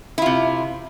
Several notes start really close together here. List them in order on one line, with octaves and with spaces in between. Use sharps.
E4 F4 C3